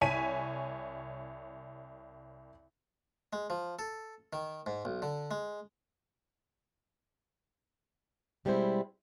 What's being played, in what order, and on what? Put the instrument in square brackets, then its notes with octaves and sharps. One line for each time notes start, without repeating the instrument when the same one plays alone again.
[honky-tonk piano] C2 C#5 G#5 B6 D#7
[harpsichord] G#3
F3
A4
D#3
G#2
B1
D3
G#3
[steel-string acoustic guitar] B2 G3 G#3 C4 E4 C5